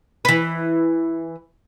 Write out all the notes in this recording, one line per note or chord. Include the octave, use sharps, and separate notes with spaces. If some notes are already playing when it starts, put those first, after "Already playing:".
E3 B4